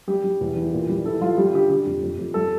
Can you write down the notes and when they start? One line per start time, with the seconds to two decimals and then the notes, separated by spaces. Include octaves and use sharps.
0.08 G3 G4
0.24 G3
0.41 E2
0.56 E3
0.73 A#2
0.89 G3
1.05 E3 A4
1.21 G3 F4
1.37 G3 G4
1.46 F4
1.54 D3 G4
1.70 D3 G4
1.86 F2
2.02 F2
2.18 F2
2.34 G3 A4